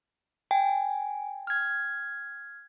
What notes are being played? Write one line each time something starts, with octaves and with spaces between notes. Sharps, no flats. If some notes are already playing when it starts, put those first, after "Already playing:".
G5 G#5
F6 G#6